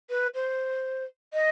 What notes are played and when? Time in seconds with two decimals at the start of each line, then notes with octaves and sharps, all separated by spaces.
0.10 B4
0.35 C5
1.34 D#5